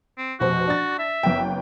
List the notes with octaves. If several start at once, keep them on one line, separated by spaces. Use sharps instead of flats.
C4
F1 B2 F#4 C5
D4 A6
E5
F#1 B3 G5